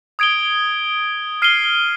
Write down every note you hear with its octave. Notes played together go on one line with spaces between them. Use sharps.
D#6 G#6 D7 G7
F6 C7 D#7 G7